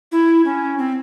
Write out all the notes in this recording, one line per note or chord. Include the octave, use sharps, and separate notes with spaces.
E4
C#4
C4